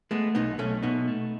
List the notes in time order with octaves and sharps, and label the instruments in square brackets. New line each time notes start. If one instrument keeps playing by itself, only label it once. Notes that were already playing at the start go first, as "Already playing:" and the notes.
[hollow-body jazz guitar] G#3 B3 [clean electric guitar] A3
[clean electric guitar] B1 [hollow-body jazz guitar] B3 D#4
[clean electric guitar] B1 [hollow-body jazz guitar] A3 C#4
[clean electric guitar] B2 [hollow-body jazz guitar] B3 D#4
[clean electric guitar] A3